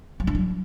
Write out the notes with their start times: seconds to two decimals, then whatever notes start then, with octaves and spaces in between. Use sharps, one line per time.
0.20 F#3
0.27 D4
0.35 F#3